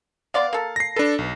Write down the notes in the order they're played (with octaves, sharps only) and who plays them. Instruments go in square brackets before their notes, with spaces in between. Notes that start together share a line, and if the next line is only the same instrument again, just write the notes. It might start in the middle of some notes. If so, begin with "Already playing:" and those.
[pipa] B3 D5 C6 [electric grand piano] F5
[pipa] A#3 A4
[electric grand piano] A#6 C7
[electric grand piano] D4 A4 [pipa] B4
[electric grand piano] B1